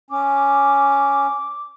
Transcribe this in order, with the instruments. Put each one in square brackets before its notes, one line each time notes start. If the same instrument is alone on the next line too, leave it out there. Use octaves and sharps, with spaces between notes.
[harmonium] C#4 [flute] D6